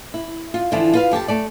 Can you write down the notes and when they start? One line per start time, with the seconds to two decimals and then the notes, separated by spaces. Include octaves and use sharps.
0.14 E4
0.54 F4
0.72 D3 E3 F3 E4
0.93 F4 B4 F5
1.11 F2 G4 G#5 A5
1.28 A3 D5